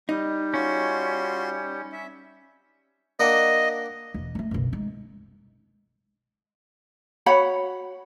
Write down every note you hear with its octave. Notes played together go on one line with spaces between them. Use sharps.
G3 D#4
C#4 F4 F#4 C6
E5
A#3 D4 D#5 F#5
E1 E2
A3 D#4
F#1 B1
G#3 D#4
F#4 C#5 F#5 B5